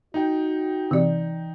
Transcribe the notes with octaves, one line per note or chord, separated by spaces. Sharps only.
D#4 F#4 G5
C3 E3 D5